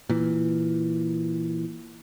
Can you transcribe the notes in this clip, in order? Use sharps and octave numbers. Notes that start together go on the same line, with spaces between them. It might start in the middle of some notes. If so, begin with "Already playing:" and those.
A#2 E3